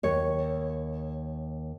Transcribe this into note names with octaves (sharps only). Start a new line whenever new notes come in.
D#2 C#5